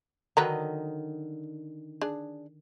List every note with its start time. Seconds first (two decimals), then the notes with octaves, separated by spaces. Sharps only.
0.37 D3 D#3 F#3 B4 D#5 A#5
2.01 D4 G#4